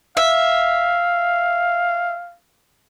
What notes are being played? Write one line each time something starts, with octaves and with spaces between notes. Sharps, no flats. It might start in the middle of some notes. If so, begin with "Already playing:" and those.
E5 F5